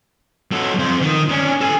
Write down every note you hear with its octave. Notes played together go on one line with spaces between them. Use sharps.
F#3 A4
F2 C5
D#3
C#4 D4
A4 G#5